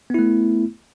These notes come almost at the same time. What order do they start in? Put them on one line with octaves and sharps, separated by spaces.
B3 E4 A3